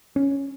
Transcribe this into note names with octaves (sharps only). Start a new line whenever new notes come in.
C#4